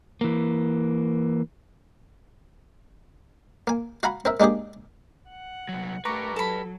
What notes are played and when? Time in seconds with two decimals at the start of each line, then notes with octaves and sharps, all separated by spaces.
0.21 E3 A#3
3.67 A#3 G#5
4.03 F#4 F5 G#5 A#5 B5 C#6
4.25 C4 A#4 E5
4.40 G#3 A#3 D4 G4 G#4
5.30 F#5
5.69 C2 F#3
6.05 A3 G4 A#4 B4 F#5 A#5 C#6 D6
6.36 F#3 A4 A5 B5